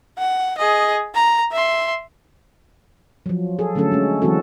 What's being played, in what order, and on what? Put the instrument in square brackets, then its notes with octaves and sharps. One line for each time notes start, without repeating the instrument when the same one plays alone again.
[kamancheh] F#5
G#4 D#5
A#5
E5 C6
[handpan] F3 F#3
G#4 A4
D3 F#3 A3 C#4 A4
G#3 C#4
E3 F#3 G#3 C4 F#4 A4